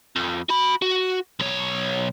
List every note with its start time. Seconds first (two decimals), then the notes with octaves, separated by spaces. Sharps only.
0.16 F2
0.49 F#4 B5
0.82 F#4
1.40 B1 C#5